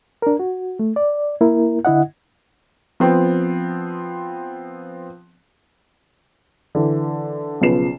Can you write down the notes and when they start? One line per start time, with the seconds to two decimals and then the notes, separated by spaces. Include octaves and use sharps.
0.22 D4 A#4
0.39 F#4
0.79 A3
0.96 D5
1.41 A#3 E4 A#4
1.85 D3 E4 D#5 F#5
3.00 F3 B3 C4
6.75 D3 E3
7.61 B1 C#3 F3 B4 C7 E7